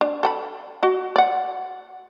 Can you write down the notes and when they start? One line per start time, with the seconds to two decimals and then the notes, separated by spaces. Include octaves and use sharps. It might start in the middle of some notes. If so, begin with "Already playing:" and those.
0.01 D4
0.23 A4 G5 B5
0.83 F#4 D#5
1.16 D5 F#5